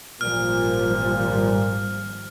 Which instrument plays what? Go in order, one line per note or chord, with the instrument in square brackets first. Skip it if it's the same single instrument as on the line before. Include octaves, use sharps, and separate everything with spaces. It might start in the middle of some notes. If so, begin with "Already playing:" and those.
[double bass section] G#1 F3 G3 [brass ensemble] A#2 [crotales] F6